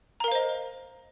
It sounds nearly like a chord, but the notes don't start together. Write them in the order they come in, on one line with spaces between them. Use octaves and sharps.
A#5 A#4 F5 C5 D#5